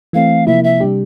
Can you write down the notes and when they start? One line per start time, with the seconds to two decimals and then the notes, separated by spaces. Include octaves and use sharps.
0.13 E3 A3 C4 F5
0.47 C3 F3 A#3 E4 E5
0.64 E5
0.80 C3 G3 D4 G4